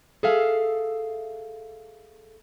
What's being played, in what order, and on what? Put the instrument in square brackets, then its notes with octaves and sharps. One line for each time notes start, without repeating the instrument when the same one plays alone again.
[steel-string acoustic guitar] G#4 A4 E5 F5